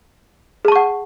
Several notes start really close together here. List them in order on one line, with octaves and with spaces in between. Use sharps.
G#4 A5 C#6 F#5